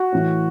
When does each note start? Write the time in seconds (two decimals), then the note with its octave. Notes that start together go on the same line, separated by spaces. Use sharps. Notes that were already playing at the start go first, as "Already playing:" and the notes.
Already playing: F#4
0.12 A2 E3